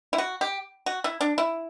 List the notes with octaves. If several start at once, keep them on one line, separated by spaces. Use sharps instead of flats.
E4
F#4
G4
F#4
E4
D4
E4